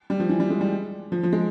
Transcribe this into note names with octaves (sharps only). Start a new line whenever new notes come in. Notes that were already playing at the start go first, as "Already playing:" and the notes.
G3
F3
E3
G3
G#3
G3
F3
F3
G#3